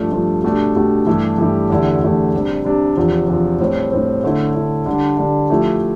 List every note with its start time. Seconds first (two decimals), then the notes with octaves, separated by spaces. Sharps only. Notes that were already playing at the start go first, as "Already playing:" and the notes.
Already playing: G2 F3 A3 D4
0.12 G2 F3 A3 D4
0.44 B2 A3 D4 G4
0.76 B2 A3 D4 G4
1.07 G2 E3 A3 E4 G4
1.38 G2 E3 A3 E4 G4
1.70 E2 D3 A3 E4 G4
2.02 E2 D3 A3 E4 G4
2.33 C3 G3 D4
2.65 C3 G3 D4
2.96 E2 C3 F3
3.28 E2 C3 F3
3.60 A2 G3 C4
3.92 A2 G3 C4
4.24 D3 A3 E4
4.55 D3 A3 E4
4.86 D3 G3 D4
5.17 D3 G3 D4
5.49 F3 A3 E4 G4